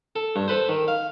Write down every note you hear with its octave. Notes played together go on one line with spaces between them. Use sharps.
A4
G2
A4 B4 C5
D#3
F5